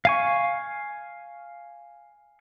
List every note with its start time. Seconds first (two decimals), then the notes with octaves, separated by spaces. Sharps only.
0.05 F5 G#5 C#6